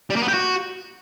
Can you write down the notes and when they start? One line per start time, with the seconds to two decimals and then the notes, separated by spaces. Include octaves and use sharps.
0.10 G3
0.16 A#3
0.22 B3
0.28 G4
0.34 F#4